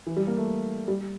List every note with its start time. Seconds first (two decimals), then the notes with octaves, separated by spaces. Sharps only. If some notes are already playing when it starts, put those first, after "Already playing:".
0.06 E3
0.17 G3
0.27 A#3
0.37 A3
0.88 G3